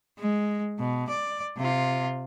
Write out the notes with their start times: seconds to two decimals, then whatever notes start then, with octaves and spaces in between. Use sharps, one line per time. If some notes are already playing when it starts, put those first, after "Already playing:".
0.19 G#3
0.79 B2
1.09 D5
1.57 C3 F4